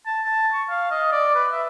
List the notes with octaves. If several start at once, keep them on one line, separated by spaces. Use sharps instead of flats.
A5
A5
C#6
F5
D#5
D5
B4
E5